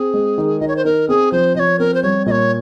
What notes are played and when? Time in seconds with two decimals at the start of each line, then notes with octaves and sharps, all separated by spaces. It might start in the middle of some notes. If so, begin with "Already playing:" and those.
Already playing: C4 G#4
0.14 G#3
0.38 D#3
0.60 D#3 D#5
0.68 C#5
0.76 C5
0.85 D#4 A#4
1.09 C4 G#4
1.32 F3 C5
1.55 F3 D#5
1.60 C#5
1.79 C4 A#4
1.94 C5
2.03 G3 C#5
2.26 A#2 D#5
2.31 C#5